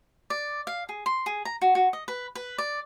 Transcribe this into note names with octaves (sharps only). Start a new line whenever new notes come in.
D5
F5
G#4
C6
G#4
A#5
F#4
F#4
D#5
B4
B4
D5